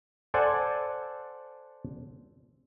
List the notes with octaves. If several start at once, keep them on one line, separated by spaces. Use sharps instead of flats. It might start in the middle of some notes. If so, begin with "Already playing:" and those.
A4 C5 D5 F#5 G#5